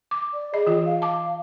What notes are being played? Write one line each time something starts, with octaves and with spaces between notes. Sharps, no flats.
D6
D5
G#4 D#5
E3 F4
F5
A5 D6